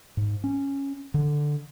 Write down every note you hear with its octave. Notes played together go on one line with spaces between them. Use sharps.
G#2
C#4
D3